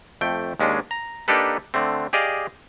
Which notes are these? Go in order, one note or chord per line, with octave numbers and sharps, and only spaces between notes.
F2 A3 G5
D#2 G#3 C#4 D4
A#5
A#3 D4 D#4 G4 A4 B4
D3 A3 C4
G4 G#4 D5 D#5 F5